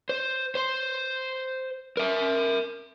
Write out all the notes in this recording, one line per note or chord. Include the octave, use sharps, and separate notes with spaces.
C5
C5 C6
A#4 E5